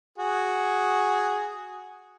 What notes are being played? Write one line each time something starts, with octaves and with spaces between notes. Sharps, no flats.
F#4 G#4